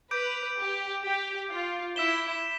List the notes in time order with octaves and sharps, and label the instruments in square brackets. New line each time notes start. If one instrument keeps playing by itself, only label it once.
[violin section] B4 [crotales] D6 G6 D7
[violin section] G4
G4
F4
[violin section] E4 [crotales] E6 B6 E7 G7